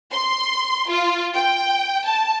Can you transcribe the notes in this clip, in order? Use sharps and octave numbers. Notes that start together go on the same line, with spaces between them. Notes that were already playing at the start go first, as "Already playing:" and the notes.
C6
F4
G5
A5